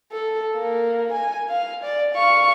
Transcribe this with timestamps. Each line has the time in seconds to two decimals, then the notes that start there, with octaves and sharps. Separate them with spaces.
0.12 A4
0.57 A#3
1.12 G#5
1.50 F5
1.84 D5
2.15 F5 C#6